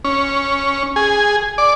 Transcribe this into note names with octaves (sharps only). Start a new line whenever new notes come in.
C#4
G#4
D5